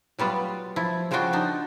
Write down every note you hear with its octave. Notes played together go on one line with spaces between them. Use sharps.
F#3 G3 B3 F4
F3 E4
C#3 F3 G3 F4 F#4 G5
D4 D#4